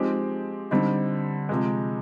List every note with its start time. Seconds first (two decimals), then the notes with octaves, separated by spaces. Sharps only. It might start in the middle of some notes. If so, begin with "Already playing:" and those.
Already playing: F3 G#3 C4 D#4 G4
0.71 D3 G3 C4 D#4
1.49 C3 F3 G#3